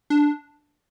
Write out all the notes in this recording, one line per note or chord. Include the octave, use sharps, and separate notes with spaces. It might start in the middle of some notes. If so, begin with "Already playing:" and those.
D4